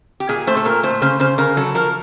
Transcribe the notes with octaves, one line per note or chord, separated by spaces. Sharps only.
G4
A#2 G#4
A3 C5
A4
A#2 A#4
A3 C5
C#3 C5
C#3 C5
C#3 A#4
F#3 A4
F3 A#4